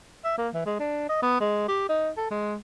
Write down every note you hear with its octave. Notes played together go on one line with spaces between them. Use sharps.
E5
A#3
E3
G#3
D4
D#5
B3
G#3
G4
D#4
A4
G#3